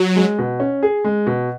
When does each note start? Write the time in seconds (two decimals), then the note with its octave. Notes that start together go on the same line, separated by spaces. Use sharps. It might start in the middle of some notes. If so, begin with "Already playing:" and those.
Already playing: F#3
0.16 G#3
0.39 B2
0.60 C#4
0.83 G#4
1.04 G#3
1.27 B2